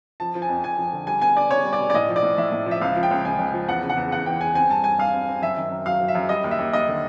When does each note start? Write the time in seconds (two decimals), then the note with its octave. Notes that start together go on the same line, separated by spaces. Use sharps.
0.20 F3 A5
0.35 F3
0.42 G#5
0.49 F2
0.63 F2 G#5
0.78 F3
0.93 D3
1.07 G3 G#5
1.21 B3 G#5
1.36 D4 D5
1.51 B3 C#5
1.65 G3
1.73 D5
1.80 B2
1.90 D5
1.94 A2 D#5
2.09 F3
2.16 D5
2.23 A2
2.38 A2 E5
2.52 A2
2.66 F3 E5
2.81 C#2 F5
2.96 F3
3.03 G5
3.11 C#2
3.25 C#2 G#5
3.39 C#2
3.47 G5
3.54 F3
3.68 E2 F#5
3.83 C#3
3.90 F#5
3.97 E2
4.12 E2 F#5
4.26 E3 G5
4.41 E2 G#5
4.55 C4 G#5
4.70 G2 A5
4.84 G2 G#5
4.99 G2 F5
5.13 C4
5.28 C4
5.42 F#2 E5
5.57 D#3
5.71 F#2
5.86 F#3 F5
6.01 F#3
6.08 E5
6.15 F#2
6.29 G3 D#5
6.44 D#2
6.51 E5
6.59 D#2
6.73 D#2 D#5
6.88 D3